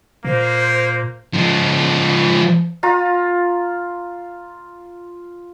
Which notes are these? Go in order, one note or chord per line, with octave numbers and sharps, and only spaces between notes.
A#2 A#3 C5
F3 G#3
F4 A#5